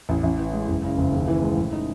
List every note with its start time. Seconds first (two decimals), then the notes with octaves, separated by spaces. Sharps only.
0.09 A1
0.23 A1
0.39 E3
0.53 G#3
0.68 F#1
0.83 C#3
0.98 F#1
1.13 D#2
1.28 E3
1.43 G#3
1.57 A2
1.72 D#4